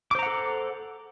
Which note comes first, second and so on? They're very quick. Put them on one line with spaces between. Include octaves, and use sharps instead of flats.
D6 C5 A#5 F#5 A4